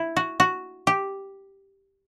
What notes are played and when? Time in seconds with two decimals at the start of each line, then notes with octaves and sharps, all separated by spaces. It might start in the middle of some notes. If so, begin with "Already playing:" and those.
Already playing: E4
0.16 F#4
0.40 F#4
0.87 G4